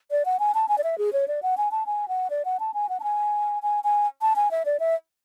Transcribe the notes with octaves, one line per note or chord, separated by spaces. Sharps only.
D5
F#5
G#5
A5
G#5
D5
E5
G#4
C#5
D5
F#5
G#5
A5
G#5
F#5
D5
F#5
A5
G#5
F#5
A5
G#5
G#5
G#5
A5
G#5
E5
D5
E5